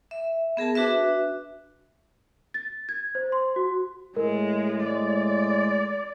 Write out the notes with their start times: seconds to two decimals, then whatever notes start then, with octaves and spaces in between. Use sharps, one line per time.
0.11 E5
0.57 B3 G#4 A#4 A5
0.75 D4 F#4 B4 E5
2.54 A6
2.89 G#6
3.15 C5
3.32 C6
3.56 F#4
4.17 A2 G#3 A#4
4.84 G#3 D5